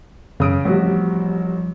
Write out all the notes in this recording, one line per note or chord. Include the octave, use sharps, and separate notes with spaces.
F#2 C#3 D#6 D7
A1 C3 F3 G3 F#4